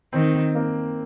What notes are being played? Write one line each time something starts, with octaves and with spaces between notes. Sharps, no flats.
D#3 C4
A#3